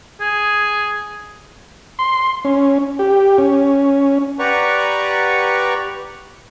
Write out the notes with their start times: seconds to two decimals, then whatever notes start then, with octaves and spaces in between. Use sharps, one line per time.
0.21 G#4
1.99 C6
2.45 C#4
2.99 G4
3.38 C#4
4.39 G4 B4 D5 F#5 A#5 C#6